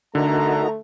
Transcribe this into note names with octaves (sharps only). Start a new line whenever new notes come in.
D3 A3 D#4 F#4 A#4 A#5